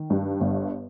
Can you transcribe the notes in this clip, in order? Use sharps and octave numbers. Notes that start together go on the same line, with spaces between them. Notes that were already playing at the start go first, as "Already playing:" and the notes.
Already playing: D#3
G2
G1